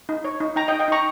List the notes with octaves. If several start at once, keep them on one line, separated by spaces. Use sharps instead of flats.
D#4
C#5
D#4
D#4 G5 A#5
D#5 G5
D#4
D#5 G5
D#4 A#5 C#6